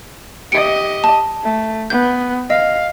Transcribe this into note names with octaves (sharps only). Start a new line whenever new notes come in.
G4 D#5 C#7 D7
A5
A3
B3 G6
D#5 F5